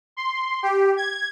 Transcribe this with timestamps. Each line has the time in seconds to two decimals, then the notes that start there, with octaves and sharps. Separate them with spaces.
0.17 C6
0.63 G4
0.97 G#6